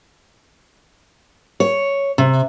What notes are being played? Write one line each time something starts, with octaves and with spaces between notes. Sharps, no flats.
C#5
C3